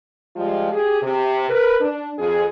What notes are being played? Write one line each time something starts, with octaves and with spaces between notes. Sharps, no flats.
F3 G3 G#3 F4 G4
G4 G#4
C3
A#4 B4
D4
F2 G#4